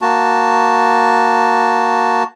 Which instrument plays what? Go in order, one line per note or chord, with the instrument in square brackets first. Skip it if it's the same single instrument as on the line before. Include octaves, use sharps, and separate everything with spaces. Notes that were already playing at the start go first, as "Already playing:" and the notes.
[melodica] A#3 F#4 A5